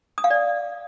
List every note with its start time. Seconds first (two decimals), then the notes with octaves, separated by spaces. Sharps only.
0.18 D#6
0.24 F5
0.30 D5